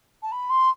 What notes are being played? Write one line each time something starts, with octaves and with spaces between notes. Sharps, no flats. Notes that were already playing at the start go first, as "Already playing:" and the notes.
A5
B5
C6